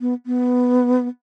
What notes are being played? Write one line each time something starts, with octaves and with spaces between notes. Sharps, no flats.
B3
B3